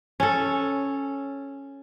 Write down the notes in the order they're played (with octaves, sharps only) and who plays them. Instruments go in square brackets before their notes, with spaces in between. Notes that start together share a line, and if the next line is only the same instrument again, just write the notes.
[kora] C#4 A4